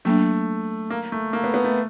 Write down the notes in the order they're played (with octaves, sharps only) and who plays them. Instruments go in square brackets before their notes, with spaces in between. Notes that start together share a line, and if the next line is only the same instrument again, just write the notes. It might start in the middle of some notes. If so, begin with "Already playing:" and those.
[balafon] F#3 A#3 D4 [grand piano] A3
[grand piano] A#3
A3
A#3
B3
B3
A3